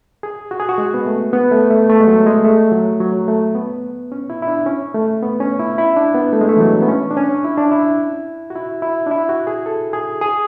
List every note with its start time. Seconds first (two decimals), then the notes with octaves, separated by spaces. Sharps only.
0.23 G#4
0.51 F#4
0.60 G#4
0.69 F#4
0.78 G#3
0.94 B3
1.07 A3
1.33 B3
1.52 A3
1.71 A3
1.89 A3
2.00 G#3
2.08 F#3
2.26 G#3
2.44 A3
2.72 F#3
3.00 F#3
3.28 A3
3.55 B3
4.12 C#4
4.30 E4
4.42 E4
4.48 D4
4.66 C#4
4.94 A3
5.23 B3
5.40 C#4
5.59 E4
5.78 E4
5.96 D4
6.15 B3
6.33 A3
6.41 G#3
6.49 A3
6.57 E3
6.61 F#3
6.82 B3
6.88 C#4
7.11 D4
7.17 C#4
7.45 E4
7.58 D4
7.71 E4
8.50 F#4
8.55 E4
8.82 E4
9.07 D4
9.11 E4
9.29 F#4
9.47 G#4
9.66 A4
9.93 G#4
10.21 G#4